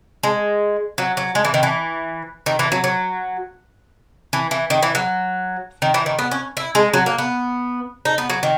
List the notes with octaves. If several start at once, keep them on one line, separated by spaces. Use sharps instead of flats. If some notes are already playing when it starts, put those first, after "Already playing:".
G#3
F#3
F#3
G#3
E3
D#3
E3
D#3
E3
F#3
F#3
E3
E3
D#3
E3
F#3
D#3
E3
D#3
B3
C#4
E4
G#3
F#3
A#3
B3
D#4
B3
F#3
D#3